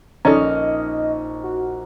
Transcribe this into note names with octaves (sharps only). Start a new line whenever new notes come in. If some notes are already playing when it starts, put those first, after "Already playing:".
A#1 C#4 D#4 A4 D5 D#5 A#5 F6
F#4